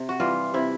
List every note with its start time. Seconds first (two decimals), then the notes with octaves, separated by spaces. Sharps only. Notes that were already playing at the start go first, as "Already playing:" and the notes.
Already playing: C3
0.09 F#4
0.20 E3 G3 F4
0.54 C3 E4